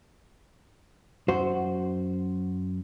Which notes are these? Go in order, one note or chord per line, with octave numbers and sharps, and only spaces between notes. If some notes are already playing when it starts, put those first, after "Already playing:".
F#2 F#4 C5